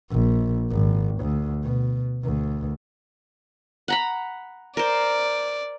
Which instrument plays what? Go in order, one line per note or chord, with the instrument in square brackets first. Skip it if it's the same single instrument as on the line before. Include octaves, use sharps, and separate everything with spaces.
[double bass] A#1
G#1
D2
B2
D2
[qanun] F#5 A#5 B5
[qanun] A#4 C5 [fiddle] D5